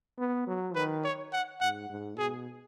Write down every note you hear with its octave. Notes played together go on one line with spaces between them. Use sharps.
B3
F#3
D#3 B4
C#5
F#5
G#2 F#5
G#2
B2 G#4